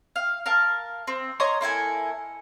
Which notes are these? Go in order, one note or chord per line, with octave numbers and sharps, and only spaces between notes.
F5
A#4 F5 A5
C4
C#5 D#5 A#5 C6
A#3 E4 A4 G#5